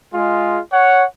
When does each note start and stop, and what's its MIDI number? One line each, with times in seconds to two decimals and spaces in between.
0.14 0.59 56
0.14 0.59 65
0.72 1.04 73
0.72 1.04 78